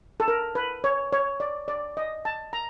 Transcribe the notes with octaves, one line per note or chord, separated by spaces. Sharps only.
A4
A#4
B4
C#5
C#5
D5
D5
D#5
A5
A#5